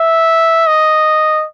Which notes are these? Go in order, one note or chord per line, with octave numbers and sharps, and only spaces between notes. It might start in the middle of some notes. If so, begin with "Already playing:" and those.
Already playing: E5
D#5